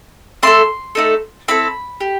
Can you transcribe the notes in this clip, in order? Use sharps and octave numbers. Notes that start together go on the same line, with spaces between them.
A3 E4 A4 C6
A3 D#4 A4
C4 E4 A4 B5
G4